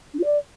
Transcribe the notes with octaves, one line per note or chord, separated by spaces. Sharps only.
D4
F4
D5